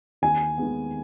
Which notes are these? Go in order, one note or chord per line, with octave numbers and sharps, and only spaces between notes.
D#2 G#5
D#3 G#3 B3